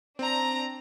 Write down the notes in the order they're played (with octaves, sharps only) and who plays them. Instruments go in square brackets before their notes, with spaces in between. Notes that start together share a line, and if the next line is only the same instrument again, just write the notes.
[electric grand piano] C4 [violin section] D4 A#5